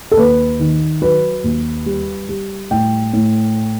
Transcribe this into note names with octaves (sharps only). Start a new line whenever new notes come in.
A4
D#2 B4
D#3
F#3 B4
D#2
G3
G3
A2 G5
A2